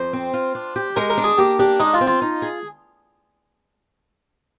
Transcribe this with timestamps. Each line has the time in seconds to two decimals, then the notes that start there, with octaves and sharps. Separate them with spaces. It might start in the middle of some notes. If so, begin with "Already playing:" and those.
Already playing: F2 C5
0.13 C4
0.34 F4
0.55 D4
0.76 G4
0.96 G#3 A#4
1.10 A#4
1.18 D4
1.24 G#4
1.38 A#3 G4
1.59 D4 G4
1.79 G#3 D#4
1.93 F4
2.01 C4
2.07 F4
2.22 D#4
2.42 G#4